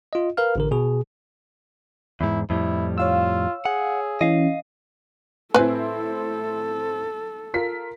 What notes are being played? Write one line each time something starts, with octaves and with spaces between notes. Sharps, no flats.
F4 D#5
A#4 B4 F5 F6
A1 D3 A#4
B2 G#4
E2 G#2 E4
F2 A2 G3 E4
F4 C#5 F5 E6
G#4 F#5
E3 C#4 D#5 F5
A2 C4 E4 A4 B4 G#5
F4 A#4 B6